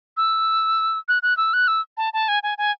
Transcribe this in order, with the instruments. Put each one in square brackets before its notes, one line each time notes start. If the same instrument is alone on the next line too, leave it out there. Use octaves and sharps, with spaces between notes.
[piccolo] E6
F#6
F#6
E6
F#6
E6
A5
A5
G#5
G#5
G#5